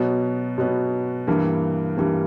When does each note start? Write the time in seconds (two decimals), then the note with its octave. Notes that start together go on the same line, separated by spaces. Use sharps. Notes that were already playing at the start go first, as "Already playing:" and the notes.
Already playing: B2 F#3 B3
0.58 B2 F#3 B3
1.27 G2 E3 G3 A#3
1.97 G2 E3 G3 A#3